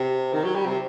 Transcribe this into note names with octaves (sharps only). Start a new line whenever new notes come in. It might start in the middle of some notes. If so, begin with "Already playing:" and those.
Already playing: C3
D#3
F#3
G3
C3